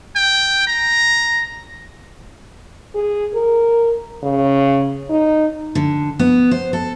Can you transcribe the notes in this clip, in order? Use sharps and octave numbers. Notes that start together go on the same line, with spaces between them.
G5
A#5
G#4
A#4
C#3
D#4
D3
B3
C5
A4